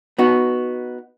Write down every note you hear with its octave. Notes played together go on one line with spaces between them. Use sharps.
B3 D#4 F#4